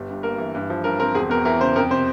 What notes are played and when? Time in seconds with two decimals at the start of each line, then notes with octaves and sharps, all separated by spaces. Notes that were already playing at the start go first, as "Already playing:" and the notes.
Already playing: G1 G3
0.09 G2
0.23 A#3 A#4
0.38 E3
0.55 G2
0.70 F3
0.84 G2 A#4
0.99 C4 A#4
1.15 E1 G#4
1.30 E2 A#4
1.45 E3 A#4
1.60 C#3 C5
1.76 F2 A#4
1.91 C3 C5